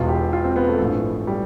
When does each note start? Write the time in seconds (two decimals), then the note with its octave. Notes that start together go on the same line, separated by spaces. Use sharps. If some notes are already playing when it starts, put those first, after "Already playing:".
Already playing: E1 E2 B2 F4
0.08 G4
0.33 F4
0.44 C4
0.56 B3
0.68 A3
0.80 A1 G2 F3
1.27 G3